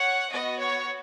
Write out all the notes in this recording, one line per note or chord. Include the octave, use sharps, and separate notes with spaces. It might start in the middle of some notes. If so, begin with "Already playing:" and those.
Already playing: C#5 F#5
B3 F#4 D#5
C#5